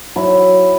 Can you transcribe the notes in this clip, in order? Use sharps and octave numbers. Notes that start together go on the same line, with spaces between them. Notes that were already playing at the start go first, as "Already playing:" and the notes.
F#3 E4